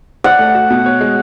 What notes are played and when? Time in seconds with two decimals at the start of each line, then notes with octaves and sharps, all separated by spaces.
0.24 D5 F#5
0.39 A3
0.55 F#4
0.70 B2
0.86 C#5
1.01 G#3